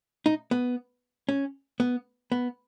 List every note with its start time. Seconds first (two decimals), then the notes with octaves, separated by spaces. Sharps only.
0.26 D#4
0.51 B3
1.29 C#4
1.80 B3
2.32 B3